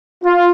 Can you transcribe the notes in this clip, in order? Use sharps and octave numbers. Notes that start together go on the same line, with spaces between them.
F4